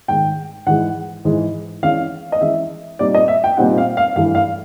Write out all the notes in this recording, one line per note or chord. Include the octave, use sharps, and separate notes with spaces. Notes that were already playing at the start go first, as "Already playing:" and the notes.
G#2 D#3 G#3 G5
G#2 E3 G#3 F#5
G#2 E3 G#3
E3 G#3 C#4 F5
D#5
E3 G#3 C#4 E5
A#2 G3 C4 D#4 D5
D#5
E5
G5
A#2 G3 C4 D#4 F#5
F5
F5
G2 E3 A3 F5
F5